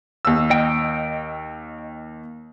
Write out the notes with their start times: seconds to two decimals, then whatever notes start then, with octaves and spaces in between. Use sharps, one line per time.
0.25 D#2 E6
0.50 D#5 G5